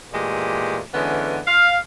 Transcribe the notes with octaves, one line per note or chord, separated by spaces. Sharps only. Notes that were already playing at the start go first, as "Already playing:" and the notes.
A#2 E3 G#3 A3 G4
D3 E3 G#3 B3 C#4
F5